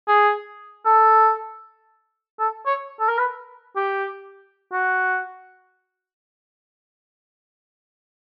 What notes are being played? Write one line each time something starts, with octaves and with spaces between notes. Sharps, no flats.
G#4
A4
A4
C#5
A4
A#4
B4
G4
F#4